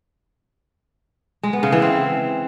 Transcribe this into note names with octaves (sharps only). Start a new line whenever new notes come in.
G#3
B3
C#3
E3
C4